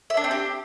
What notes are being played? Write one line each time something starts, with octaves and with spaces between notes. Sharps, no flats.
E5
D4
C4
G4